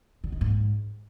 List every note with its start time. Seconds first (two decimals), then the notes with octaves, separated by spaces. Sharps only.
0.24 D3
0.32 D#3
0.41 G#2